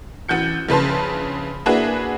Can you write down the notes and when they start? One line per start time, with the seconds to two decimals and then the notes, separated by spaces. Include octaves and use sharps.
0.29 A1 F#4 G6 C#7
0.69 A#1 C#3 B4 A5 C6
1.66 A#3 D4 E4 F#4 G#4 B4